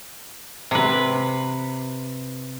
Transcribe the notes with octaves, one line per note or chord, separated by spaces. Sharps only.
C3 B4